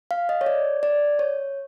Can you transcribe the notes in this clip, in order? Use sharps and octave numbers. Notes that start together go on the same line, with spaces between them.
F5
D#5
C#5
D5
D5
C#5